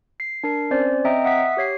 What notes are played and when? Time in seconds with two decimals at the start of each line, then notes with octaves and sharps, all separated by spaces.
0.20 C7
0.44 D4 A#4 C7
0.71 C4 C#4 C5 D5
1.04 C4 D#5 E5 G5 A#5 D#6
1.24 E5 F#5 D#6 B6
1.57 G4 C#5 C7